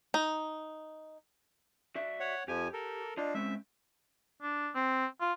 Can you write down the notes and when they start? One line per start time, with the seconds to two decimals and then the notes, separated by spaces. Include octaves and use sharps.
0.14 D#4
1.95 F#4 D5 E5
2.20 C#5 F#5
2.48 F2 F3 G4 G#5
2.73 A4 A#4
3.17 D4 F4 D#5
3.34 G#3 C4 C#4 E5
4.42 D4
4.74 C4
5.21 F4